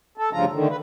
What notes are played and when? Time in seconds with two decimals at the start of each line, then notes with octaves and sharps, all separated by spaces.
0.18 A4
0.33 D2 G2 C#3 F3 F4 A#5
0.53 D3 D#3 A3
0.69 B4